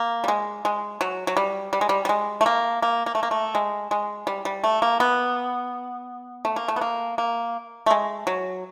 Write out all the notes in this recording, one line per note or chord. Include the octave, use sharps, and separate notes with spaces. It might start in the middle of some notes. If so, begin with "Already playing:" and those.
Already playing: A#3
G3
G#3
G#3
F#3
F#3
G3
G3
G#3
G3
G3
G#3
A3
A#3
A#3
A#3
A3
A#3
A3
G#3
G#3
G3
G3
A3
A#3
B3
A3
A#3
A3
B3
A#3
A#3
A3
G#3
F#3